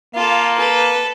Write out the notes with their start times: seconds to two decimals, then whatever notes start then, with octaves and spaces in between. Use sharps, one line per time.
0.15 A#3 F4 A4
0.57 A4 B4